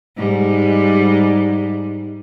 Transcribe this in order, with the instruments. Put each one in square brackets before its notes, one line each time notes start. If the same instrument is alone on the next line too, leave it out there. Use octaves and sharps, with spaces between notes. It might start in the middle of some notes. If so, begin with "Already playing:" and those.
[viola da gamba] G#2 G3